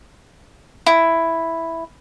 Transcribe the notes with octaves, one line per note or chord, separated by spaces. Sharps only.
E4